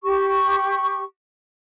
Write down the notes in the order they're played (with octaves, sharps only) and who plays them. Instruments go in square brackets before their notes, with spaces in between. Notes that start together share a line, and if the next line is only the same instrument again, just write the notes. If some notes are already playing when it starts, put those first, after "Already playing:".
[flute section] G4 C#6